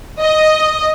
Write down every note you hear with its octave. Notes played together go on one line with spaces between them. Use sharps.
D#5